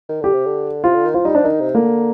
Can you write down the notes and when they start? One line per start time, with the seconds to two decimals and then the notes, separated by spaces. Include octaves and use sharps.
0.09 D#3
0.21 D3 G4
0.33 C3
0.46 D3
0.84 C3 F4
0.94 D3
1.05 D#3
1.14 F3 F4
1.25 G3 D#4
1.35 F3 D4
1.44 D#3 D#4
1.60 C3
1.75 D3 A#3